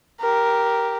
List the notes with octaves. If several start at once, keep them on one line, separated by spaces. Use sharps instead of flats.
G4 A#4